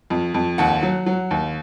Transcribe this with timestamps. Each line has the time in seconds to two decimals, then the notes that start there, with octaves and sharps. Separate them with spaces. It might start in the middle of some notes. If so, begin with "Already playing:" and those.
0.10 F2
0.34 F2
0.58 D#2 F#5
0.83 F#3
1.06 F#3
1.31 D#2